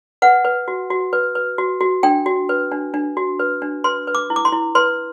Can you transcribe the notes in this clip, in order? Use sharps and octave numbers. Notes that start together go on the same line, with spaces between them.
B4 F#5
B4
F#4
F#4
B4
B4
F#4
F#4
D4 G5
F#4
B4
D4
D4
F#4
B4
D4
B4 C6
B4
D6
E4
D6
C6
E4
B4 C6